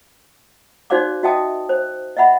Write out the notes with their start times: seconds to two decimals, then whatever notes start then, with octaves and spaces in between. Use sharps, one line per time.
0.90 D#4 F#4 C5 D5 F5 D6
1.23 F#4 D#5 E5 G5 A5 D#6
1.69 C5
2.17 D#5 E5 F#5 B5